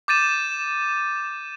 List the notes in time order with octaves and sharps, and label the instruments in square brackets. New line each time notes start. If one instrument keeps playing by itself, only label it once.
[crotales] D6 G6 A6 D#7 E7